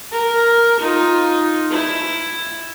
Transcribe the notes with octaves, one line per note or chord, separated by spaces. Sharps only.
A#4
D#4 F4
E4